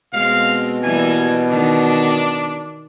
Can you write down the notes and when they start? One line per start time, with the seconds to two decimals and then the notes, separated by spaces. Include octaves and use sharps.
0.13 B2 G#3 C4 F5
0.83 E3 G3 A#3 G#5
1.50 D#3 D4